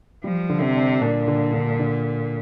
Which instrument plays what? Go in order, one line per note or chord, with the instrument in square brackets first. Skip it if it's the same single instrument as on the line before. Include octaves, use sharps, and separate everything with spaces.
[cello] F3 [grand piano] G3
[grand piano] D3
[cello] C3
[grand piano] D4
[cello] A#2 [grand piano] D4
[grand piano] D3
D3
D3